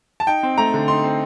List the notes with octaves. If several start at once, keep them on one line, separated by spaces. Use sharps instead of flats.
A5
D#4 G5
C4
A3 A#5
D3
D#4 C6
C4